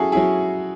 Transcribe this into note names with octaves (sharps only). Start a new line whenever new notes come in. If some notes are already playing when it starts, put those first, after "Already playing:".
Already playing: F#3 C#4 E4 F#4 G#4 A4
F#3 C#4 E4 G#4